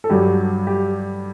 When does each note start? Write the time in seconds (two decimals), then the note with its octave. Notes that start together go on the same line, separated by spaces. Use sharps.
0.04 A4
0.10 G2 F#3 G4
0.67 G4